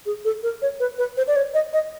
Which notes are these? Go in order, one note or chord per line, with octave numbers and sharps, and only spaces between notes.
G#4
A4
A#4
C#5
B4
B4
C5
D5
C#5
D#5
D#5